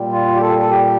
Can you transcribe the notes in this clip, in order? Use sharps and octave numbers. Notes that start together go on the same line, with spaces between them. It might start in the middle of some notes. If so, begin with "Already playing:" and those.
Already playing: A#2 G3
F4
G4
A4
A4
G4